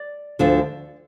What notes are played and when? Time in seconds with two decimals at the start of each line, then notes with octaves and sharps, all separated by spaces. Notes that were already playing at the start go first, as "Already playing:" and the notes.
Already playing: D5
0.39 D2 D3 F3